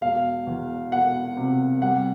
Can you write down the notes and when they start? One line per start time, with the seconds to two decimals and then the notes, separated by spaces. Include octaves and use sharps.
0.01 E1 F5
0.47 E2
0.92 E1 F#5
1.37 C3
1.82 G3 F#5